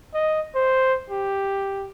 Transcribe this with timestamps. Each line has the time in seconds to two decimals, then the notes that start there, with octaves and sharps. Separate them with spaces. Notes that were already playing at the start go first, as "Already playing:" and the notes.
0.14 D#5
0.55 C5
1.10 G4